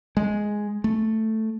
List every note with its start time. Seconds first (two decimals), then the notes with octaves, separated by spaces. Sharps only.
0.17 G#3
0.84 A3